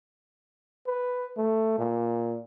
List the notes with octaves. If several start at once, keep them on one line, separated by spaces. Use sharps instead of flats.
B4
A3
A#2